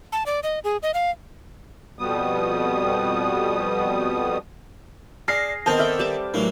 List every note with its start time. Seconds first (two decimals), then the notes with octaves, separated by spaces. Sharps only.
0.12 A5
0.26 D5
0.43 D#5
0.64 G#4
0.83 D#5
0.94 F5
1.99 F2 B2 G3 B3 D#6
5.28 D4 G#4 F6 A#6 C7
5.66 D#3 B3 C4 D#4 A#4 D#5 A5 G6
5.79 A4 D5 E5 G5 F6
5.99 G3 A5 D6
6.34 A2 E3 F#3 A#3